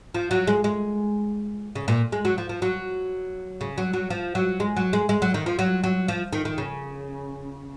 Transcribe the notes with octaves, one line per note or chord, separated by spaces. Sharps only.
F3
F#3
G#3
G#3
C#3
A#2
G#3
F#3
F3
F3
F#3
C#3
F#3
F#3
F3
F#3
G#3
F#3
G#3
G#3
F#3
D#3
F3
F#3
F#3
F3
D#3
D#3
C#3